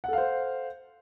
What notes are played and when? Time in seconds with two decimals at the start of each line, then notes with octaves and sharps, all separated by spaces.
0.04 F#5
0.08 A4
0.13 F5
0.18 C5